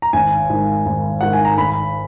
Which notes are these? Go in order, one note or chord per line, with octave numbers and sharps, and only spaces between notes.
A#5
G#1 G#5
G#2 D#3
G#1
G#2 D#3 F#5
G#5
A#5
G#1 B5